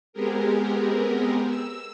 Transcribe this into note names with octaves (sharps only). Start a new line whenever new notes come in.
G#3 B3 C4 G4 G#4 A#4
E6